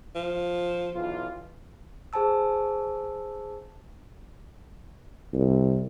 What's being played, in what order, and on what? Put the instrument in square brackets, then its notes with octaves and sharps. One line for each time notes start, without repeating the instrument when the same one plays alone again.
[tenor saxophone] F3
[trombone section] B1 E3 F4
[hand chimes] G#4 C5 G#5 A5 E6
[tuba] C2